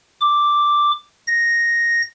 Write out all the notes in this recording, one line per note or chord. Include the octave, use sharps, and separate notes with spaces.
D6
A#6